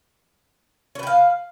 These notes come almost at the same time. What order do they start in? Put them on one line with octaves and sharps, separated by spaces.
C#5 B4 G5 F5